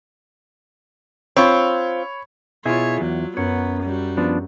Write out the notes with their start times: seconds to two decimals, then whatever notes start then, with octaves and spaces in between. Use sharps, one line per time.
1.37 C4 F4 C#5 B5 C#6
2.65 B2 E4 F4 G#4 C#5 D5
3.01 E2 F#3
3.37 F#2 B3 C#5
3.83 G3 F#4
4.17 F3 B3 D4